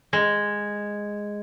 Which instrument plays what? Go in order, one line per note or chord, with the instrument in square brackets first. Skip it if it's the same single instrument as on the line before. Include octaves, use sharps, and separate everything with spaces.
[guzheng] G#3